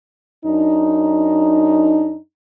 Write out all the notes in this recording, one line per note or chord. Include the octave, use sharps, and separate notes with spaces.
F#2 D4 D#4